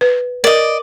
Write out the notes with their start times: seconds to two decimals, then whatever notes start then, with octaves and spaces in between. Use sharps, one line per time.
0.01 B4
0.44 A#4 D5 D#5